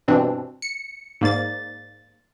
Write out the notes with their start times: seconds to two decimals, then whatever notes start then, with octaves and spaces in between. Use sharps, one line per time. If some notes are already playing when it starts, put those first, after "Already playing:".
0.08 G2 B2 E3 C4 D4
0.62 C#7
1.21 G#2 A#3 D5 A6